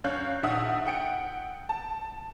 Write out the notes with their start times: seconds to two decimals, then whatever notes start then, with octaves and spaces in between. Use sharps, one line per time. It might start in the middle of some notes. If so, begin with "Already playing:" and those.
0.04 F#2 D4 C#5 F5 F#6 G6
0.43 A#1 D#3 E5 F#5 D#6
0.85 F#5 G5 C#7 D7
1.69 A5